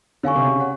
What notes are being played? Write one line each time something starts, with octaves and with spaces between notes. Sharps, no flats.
D3 C#5 F5 G#5 C#6
C3
C#3
C#5 F#5